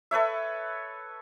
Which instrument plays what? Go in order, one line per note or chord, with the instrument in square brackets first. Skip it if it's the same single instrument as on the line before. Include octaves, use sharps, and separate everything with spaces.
[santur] A4 B4 C#5 E5